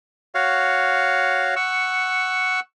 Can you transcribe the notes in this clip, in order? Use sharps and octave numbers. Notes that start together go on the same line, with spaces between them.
F#4 C#5 F5
F#5 C#6 E6